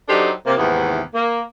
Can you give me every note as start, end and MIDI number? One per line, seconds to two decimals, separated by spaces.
0.09 0.31 54
0.09 0.31 62
0.09 0.31 63
0.09 0.31 67
0.09 0.31 69
0.09 0.31 72
0.47 0.55 48
0.47 0.55 58
0.58 1.00 39
0.58 1.00 44
0.58 1.00 48
0.58 1.00 52
0.58 1.00 59
1.15 1.42 58